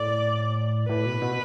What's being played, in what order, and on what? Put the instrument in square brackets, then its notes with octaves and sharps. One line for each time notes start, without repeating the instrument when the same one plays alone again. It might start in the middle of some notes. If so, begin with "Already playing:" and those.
Already playing: [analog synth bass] A2 [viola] D5
[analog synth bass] A2 [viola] B4
[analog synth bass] B2
B2